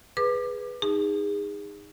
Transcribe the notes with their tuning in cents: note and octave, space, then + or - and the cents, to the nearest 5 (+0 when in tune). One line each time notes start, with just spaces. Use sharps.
G#4 +0 B4 +0 D6 +25
D#4 +0 G#4 -30